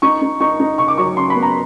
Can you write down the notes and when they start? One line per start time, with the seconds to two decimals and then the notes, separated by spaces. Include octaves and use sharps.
0.02 D#4 C#6
0.22 D#4
0.40 D#4 C#6
0.60 D#4
0.78 C#3 C#6
0.88 D6
0.98 F#3 C#6
1.16 C#3 C6
1.30 B5
1.36 B3
1.43 A#5